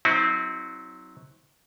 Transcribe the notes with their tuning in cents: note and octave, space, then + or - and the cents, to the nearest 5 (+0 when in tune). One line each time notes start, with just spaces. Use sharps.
F#3 +0 C4 +0 D#4 +45